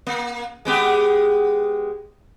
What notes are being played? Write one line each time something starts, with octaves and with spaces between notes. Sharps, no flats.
A#3
G#3 B3 G4